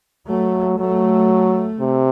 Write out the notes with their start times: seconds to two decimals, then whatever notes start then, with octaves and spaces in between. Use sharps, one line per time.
0.28 F#3 A3
0.79 F#3 A3
1.80 C3